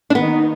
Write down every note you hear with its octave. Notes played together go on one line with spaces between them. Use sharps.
D4
D#3 A#3 B3 D#4